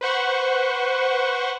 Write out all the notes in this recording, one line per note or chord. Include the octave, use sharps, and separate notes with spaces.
B4 C5 F#5 C#6